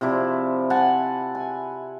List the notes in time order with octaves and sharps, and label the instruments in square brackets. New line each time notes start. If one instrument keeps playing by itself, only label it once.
[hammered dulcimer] C3 F3 E4 D5
F#5 G#5 A5
G#5